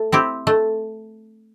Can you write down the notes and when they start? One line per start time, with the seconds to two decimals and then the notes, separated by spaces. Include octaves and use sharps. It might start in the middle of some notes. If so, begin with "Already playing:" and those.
Already playing: A3
0.12 C4 E4 G4
0.47 A3